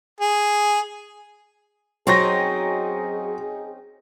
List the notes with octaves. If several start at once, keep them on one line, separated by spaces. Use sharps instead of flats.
G#4
F#3 C4 C#4 D#4 G#4 C6 C#6 A#6